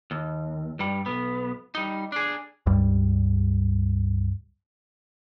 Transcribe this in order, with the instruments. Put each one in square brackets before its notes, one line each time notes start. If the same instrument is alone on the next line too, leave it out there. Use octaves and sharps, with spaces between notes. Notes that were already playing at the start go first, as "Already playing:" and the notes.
[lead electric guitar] D#2
G2 G3
B1 B3
G3 D#4
D4 G#4
[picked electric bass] C#2 G2 G3